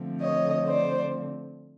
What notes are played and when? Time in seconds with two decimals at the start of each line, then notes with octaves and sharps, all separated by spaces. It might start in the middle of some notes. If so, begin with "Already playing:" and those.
Already playing: D3 F3 A3 C4
0.21 C#5 D#5
0.67 C5 D5